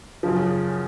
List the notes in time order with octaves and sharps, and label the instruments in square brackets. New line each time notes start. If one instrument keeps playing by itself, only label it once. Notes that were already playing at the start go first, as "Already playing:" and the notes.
[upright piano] F#2 C#3 F3